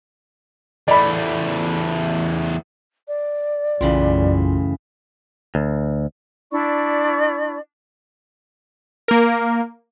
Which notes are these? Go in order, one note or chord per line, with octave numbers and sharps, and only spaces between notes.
E2 A3 D5 B5
D5
B1 F#2 A2 C#3 E3 F4 C6
D2
D4 E4 D5 C#6
A#3 A#4